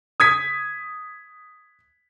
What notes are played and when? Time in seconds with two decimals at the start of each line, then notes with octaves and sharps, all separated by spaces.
0.20 D#6 G#6 B6